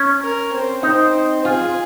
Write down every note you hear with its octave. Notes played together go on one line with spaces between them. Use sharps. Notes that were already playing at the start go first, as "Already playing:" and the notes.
Already playing: C#4
A#4
C4
C4 D#4
F4 G#4